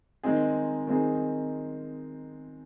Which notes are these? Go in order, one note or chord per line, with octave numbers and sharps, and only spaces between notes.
D#3 G#3 C4 D#4 G#4
D#3 G#3 C4 D#4 G#4